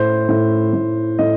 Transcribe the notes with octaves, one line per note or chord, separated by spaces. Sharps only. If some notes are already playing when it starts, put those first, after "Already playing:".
Already playing: A2 C5
A2
A2
A2 D#5